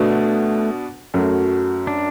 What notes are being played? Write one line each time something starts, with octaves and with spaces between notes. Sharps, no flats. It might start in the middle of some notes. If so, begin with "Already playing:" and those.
Already playing: B2 A3 B3 D4 F#4
F#2 F#3 A3
D4